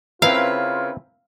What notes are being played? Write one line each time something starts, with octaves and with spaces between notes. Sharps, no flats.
C#3 C4 E4 F4 A#4 B4 F5